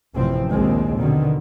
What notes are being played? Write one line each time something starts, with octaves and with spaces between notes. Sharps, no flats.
A1 F#2 A2 C3 F3 C4
A#1 D#2 D#3 G#3 C4
B2 D3 D#3